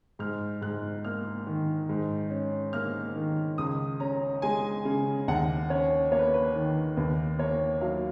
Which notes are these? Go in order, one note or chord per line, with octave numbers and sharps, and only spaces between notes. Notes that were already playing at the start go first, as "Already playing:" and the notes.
G#2 F6
G#2 F#6
A#3 F6
D#3
G#2
C#4
A#3 F6
D#3
C#2 D#6
C#4 A#5
G#3 G#5
C#3
D#2 F#5
C#4 C#5
A#3 C#5
B4
B4
D#3
D#2 B4
A#3 C#5
F#3 F5